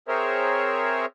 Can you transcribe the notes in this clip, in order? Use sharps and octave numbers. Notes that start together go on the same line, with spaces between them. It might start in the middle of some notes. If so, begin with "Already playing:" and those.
C4 G#4 A#4 C5 C#5 E5